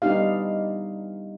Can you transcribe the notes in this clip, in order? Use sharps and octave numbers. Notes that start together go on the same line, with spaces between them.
G3 B3 D4 D#4 G4 F5